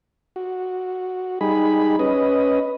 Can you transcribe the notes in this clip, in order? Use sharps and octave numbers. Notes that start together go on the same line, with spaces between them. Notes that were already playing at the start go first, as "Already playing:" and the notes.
F#4
G3 D#4 G#4 B5
C#4 B4 D#5